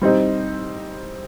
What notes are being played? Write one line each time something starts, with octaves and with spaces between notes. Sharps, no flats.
G3 C4 D#4